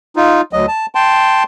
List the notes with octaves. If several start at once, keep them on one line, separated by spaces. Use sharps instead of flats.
D#4 F4
D2 F#3 D#5
A5
G5 A5 C6